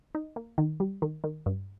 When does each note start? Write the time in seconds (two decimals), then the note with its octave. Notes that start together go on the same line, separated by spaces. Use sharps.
0.15 D#4
0.36 A#3
0.58 D#3
0.80 G3
1.02 D#3
1.24 D#3
1.46 G2